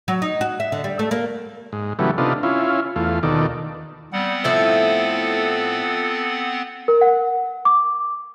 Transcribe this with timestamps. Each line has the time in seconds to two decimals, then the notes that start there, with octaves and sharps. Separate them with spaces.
0.08 F#3
0.22 D#4
0.41 F#4
0.60 E5
0.72 D3
0.84 G3
0.99 A3
1.11 A#3
1.73 G#2
1.99 C#3 E3 F#3 G3 A3 B3
2.18 C3 B3 D4 D#4 F4 A4
2.43 C#4 E4 F4
2.96 E2 A3 F4
3.23 D#2 B2 D#3 A4 D5
4.13 G3 B3 C4 F#5
4.44 A2 F3 E4 A4
6.88 A#4
7.01 F#5
7.65 D6